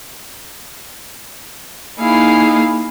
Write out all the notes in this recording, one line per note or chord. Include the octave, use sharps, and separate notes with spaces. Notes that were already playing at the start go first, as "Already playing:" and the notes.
A#3 D#4 E4 G#4 F5